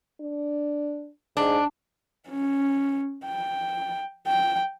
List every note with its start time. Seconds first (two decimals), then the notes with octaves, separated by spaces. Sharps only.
0.21 D4
1.37 G#2 D4
2.28 C#4
3.25 G5
4.27 G5